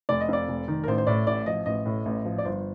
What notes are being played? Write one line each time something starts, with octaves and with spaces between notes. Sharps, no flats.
F1 D5
D#5
F2 D5
F1
D#3
A#4
A1 C5
C5
A2 D5
A1 D5
F3 D#5
A1 D#5
A2
A1
F3
D5
G1 C5